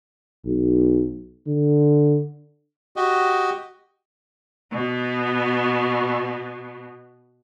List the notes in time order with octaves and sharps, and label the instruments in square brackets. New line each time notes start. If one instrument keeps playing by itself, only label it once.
[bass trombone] B1
D3
[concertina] F#4 G4 D#5
[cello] B2 B3